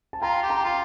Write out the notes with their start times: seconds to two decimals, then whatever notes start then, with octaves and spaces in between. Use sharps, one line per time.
0.13 A5
0.22 F4 G5 A#5
0.43 G4
0.50 G5 A#5
0.64 F4 A#5